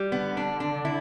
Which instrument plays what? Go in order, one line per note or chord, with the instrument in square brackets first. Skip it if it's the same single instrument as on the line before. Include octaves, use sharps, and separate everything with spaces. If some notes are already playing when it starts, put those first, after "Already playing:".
Already playing: [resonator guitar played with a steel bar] G3
[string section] D3 [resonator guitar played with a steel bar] B3
[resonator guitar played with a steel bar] D4
D4
E4